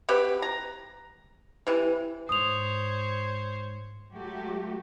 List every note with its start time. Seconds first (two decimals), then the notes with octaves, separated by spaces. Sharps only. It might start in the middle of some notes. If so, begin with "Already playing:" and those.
0.09 C4 F#4 G4 B4
0.42 A#5
1.67 C3 E3
2.29 G#2 C5 C#5 D#6 F7
4.13 F#3 G#3 A3 F#4 G4